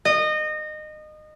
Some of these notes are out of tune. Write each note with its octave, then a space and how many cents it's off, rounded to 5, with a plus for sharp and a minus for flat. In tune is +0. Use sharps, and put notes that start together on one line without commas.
D#5 -25